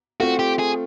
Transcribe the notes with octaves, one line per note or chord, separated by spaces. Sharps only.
A3 C4 F4 F#4
G4
G#4